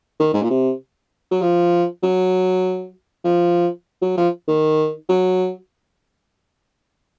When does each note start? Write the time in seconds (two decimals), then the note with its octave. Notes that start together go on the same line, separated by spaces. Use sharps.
0.19 D#3
0.33 G#2
0.42 A#2
0.50 C3
1.31 F#3
1.42 F3
2.03 F#3
3.24 F3
4.02 F#3
4.17 F3
4.48 D#3
5.09 F#3